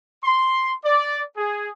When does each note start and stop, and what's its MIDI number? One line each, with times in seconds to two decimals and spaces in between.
0.24 0.72 84
0.84 1.21 74
1.37 1.70 68